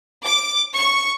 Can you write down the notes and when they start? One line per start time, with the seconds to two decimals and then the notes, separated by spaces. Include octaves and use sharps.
0.24 D6
0.76 C#6